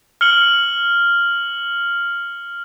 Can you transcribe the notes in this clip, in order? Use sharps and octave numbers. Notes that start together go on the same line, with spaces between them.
F6 C#7 F#7 G7